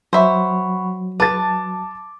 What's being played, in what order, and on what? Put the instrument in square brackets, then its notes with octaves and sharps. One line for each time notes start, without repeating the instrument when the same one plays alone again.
[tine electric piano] F#3 [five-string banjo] C5 E5 [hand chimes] F#5 B5 C#6
[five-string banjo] B4 [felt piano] A5 A6 [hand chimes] D6